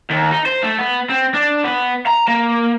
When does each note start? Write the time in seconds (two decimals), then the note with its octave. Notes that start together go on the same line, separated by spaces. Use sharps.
0.10 D#2
0.32 D#4
0.46 C5
0.63 A3
0.79 B3
1.10 C4
1.34 D4
1.64 B3
2.07 A#5
2.28 A#3